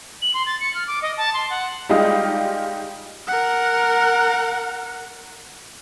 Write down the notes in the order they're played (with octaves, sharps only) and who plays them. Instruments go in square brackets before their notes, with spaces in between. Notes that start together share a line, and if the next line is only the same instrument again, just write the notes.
[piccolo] F#7
C6
A6
C#7
F6
D6
D#5
A5
C6
F#5
[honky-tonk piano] G3 G#3 D#4 F4 G4 D#5
[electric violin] A#4 F#5